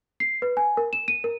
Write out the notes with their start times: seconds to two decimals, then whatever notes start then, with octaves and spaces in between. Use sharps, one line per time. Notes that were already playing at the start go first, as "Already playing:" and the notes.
0.20 C7
0.42 B4
0.57 G#5
0.77 A#4
0.93 E7
1.08 D#7
1.24 A#4